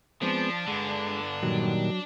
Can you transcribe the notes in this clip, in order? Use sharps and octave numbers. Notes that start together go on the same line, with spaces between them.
F3 G#3 B3 C4 D4
G2 D3 G#3
A#2 D#3 F#3 G3